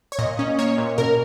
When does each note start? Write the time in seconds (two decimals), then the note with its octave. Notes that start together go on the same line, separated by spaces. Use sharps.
0.12 C#5
0.19 A#2 D#5
0.39 C#4
0.59 A#3 C#5
0.78 A#2
0.98 B2 A#4